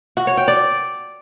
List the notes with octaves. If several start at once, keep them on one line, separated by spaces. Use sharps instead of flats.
F#4
C#5
G5
D5